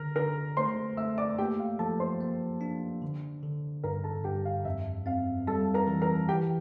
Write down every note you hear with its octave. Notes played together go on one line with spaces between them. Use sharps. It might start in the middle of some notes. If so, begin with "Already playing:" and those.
Already playing: D3 A#4
D3 A#4 A#5
A3 C5 C6
A3 E5 E6
D5 D6
A#3 G4 G5
F5
F3 A4 A5
C5 C6
A#3
D4
D3
D3
G2 A#4 A#5
A4 A5
G2 G4 G5
F5
F2 E5
C4 F5
G3 A4 A5
A#4 A#5
E3
A#4 A#5
E3 G4 G5